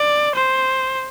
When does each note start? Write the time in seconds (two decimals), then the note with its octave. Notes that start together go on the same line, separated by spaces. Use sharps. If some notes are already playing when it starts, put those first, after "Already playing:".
Already playing: D5
0.36 C5